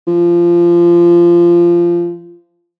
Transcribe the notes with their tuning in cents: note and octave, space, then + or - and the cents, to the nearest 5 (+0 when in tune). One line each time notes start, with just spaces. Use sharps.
F3 -20